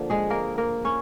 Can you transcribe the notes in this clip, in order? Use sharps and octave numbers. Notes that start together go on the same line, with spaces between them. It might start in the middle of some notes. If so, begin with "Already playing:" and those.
Already playing: D3 F3 A#3
G#3 G#4
A#3 A#4
A#3 A#4
C#4 C#5